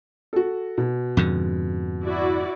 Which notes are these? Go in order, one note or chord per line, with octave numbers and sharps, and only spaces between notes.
F#4 A4
B2
F2 G#2 D3
E4 F#4 D5